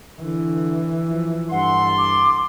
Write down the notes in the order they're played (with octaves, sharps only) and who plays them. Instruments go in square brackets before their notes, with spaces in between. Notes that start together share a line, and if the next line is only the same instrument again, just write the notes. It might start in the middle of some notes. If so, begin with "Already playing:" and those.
[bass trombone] D3 [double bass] E3
[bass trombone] F3
[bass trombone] G2 [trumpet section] A4 C6 [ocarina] F#5
[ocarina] D6